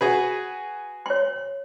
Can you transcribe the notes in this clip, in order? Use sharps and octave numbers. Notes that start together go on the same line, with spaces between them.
F#4 G#4 B4
C#5 C6